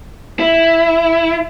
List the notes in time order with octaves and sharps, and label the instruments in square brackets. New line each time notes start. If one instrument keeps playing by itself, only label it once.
[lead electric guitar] E4